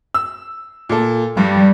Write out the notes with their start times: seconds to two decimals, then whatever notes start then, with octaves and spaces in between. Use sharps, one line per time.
0.14 E6
0.89 A#2 A4
1.37 G2 G3